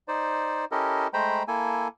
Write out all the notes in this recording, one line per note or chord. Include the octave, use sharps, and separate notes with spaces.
D#4 C5 D5
C#4 E4 G4 A4 A#4 D#5
G#3 A3 C5 G5 A#5 B5
A#3 E4 A4 G#5